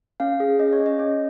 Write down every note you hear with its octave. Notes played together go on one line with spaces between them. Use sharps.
C#4 F5
G#4
C#4 D#5
C#5
C#4
D#5
C#4